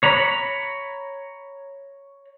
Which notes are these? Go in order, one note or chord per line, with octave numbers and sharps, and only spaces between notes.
C#5 A#5 B5